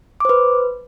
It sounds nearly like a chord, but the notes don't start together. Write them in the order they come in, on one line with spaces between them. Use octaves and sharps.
D6 C5 B4